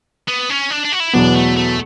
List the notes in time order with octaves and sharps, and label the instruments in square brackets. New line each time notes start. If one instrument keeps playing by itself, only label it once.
[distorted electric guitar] B3
C#4
D4
D4
F#4
E4
[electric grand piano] E2 B2 F#3 B3 [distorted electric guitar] D4
[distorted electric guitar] A3
A3